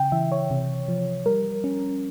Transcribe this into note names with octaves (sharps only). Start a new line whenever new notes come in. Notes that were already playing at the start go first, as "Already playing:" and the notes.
Already playing: C#3 G5
E3 E5
C#5
C3
F3
G3 A#4
C#4